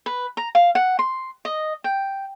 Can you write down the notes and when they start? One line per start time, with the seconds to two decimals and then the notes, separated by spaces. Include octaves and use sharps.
0.06 B4
0.37 A#5
0.55 F5
0.75 F#5
0.99 C6
1.45 D#5
1.84 G5